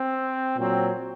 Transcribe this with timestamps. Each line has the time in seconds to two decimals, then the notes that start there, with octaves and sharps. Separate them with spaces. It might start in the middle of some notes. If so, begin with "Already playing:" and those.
Already playing: C4
0.56 A#2 F#3 C4